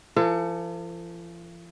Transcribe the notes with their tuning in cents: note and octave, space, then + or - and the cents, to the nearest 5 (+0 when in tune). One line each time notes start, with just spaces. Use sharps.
F3 -40 A4 +35